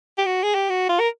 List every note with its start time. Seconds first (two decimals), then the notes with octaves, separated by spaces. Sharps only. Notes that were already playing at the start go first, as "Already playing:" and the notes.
0.18 G4
0.26 F#4
0.43 G#4
0.55 G4
0.69 F#4
0.89 F4
1.00 A#4